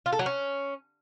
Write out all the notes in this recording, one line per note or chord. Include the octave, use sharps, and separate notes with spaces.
F4
A4
F#3
C#4